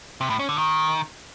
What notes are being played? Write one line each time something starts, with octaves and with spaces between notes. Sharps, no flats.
C3
A2
C#4
D3
D#3